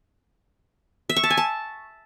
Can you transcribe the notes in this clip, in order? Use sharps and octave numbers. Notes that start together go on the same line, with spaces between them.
E5
C#6
A5
G#5
A5